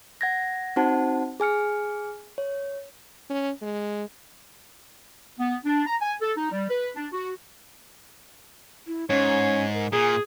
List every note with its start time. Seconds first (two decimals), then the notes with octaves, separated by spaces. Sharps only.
0.21 F#5 G#6 A#6
0.76 C4 D#4 F#4 C5 F#5 A5
1.40 G#4 G#5 F6 C#7
2.38 C#5
3.30 C#4
3.62 G#3
5.39 B3
5.65 D4
5.87 A#5
6.01 G#5
6.21 A4
6.37 D#4
6.52 G3
6.69 B4
6.95 D4
7.12 F#4
8.87 E4
9.10 G#2 C#4 C#5
9.74 A#4
9.93 A#2 G#4 G#5